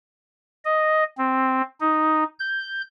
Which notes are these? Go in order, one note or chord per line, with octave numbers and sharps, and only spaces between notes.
D#5
C4
D#4
G6